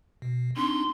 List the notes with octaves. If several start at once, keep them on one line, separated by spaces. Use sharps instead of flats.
B2
C4 D4 D#4 C6